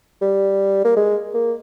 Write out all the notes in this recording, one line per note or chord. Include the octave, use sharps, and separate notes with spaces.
G3
A#3
G#3
A#3